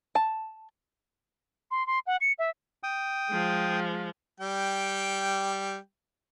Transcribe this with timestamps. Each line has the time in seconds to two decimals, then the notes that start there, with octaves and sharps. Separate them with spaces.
0.15 A5
1.71 C6
1.87 C6
2.07 F#5
2.21 C#7
2.39 E5
2.83 G5 D#6
3.30 F3 G#3
4.40 G3 G5